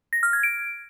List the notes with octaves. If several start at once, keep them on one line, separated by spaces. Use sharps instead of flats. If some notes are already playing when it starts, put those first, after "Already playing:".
A#6
F6
G#6
D7